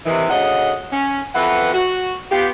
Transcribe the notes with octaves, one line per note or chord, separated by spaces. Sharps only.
C3 D#3 E3
D2 C#3 D#5 F#5
C#4
F2 E3 B4 F#5
F#4
B3 F4 G4